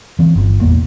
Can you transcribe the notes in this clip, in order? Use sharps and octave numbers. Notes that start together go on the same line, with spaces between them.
E3 C4
G1
A1 E2 B2 A#3